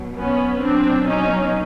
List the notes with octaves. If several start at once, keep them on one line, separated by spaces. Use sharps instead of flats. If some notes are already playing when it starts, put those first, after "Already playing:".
Already playing: B2 F#3
B3 C#4
B2 F#3 C4 D4
C#4 D#4